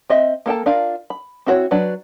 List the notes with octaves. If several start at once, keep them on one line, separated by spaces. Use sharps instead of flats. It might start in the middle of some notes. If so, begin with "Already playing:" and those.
C4 D#5 E5
A#3 A4 G5 A5
D4 F4 A#4 F5
B5
C4 E4 F#4 C5 C#5
F#3 D4 B4